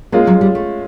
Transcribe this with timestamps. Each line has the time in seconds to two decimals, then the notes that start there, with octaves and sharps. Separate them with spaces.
0.12 G#3 A#3 C#4 F4
0.27 F#3
0.41 G3
0.55 A3